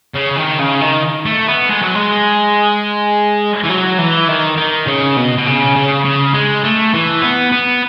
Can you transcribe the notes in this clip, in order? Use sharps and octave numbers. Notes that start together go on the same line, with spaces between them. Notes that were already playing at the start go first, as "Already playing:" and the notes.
C#3
D#3
C#3
D#3
A3
B3
G#3
F#3
G#3
E3
F#3
E3
D#3
D#3
C#3
B2
B2
C#3
C#3
C#3
G#3
A3
E3
B3
B3